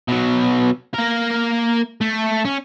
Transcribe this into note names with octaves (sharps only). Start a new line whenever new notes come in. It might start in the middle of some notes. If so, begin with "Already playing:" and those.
B2 F#3
A#3 A#4
A3
C#4